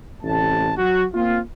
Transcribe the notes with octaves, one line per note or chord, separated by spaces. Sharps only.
A1 C3 A3 A5
F#3 F#4
A#3 C4 F4